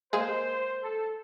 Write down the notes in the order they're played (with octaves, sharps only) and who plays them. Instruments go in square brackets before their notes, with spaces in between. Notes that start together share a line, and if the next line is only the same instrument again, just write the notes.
[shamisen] G#3 A#3 G#4 [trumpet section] C5
[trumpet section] A4